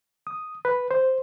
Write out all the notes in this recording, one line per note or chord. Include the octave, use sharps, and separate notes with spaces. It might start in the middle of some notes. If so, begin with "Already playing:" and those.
D#6
B4
C5